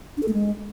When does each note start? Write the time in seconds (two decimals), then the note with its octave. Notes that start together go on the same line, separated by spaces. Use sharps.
0.17 D4
0.22 A4
0.28 A3
0.33 G#3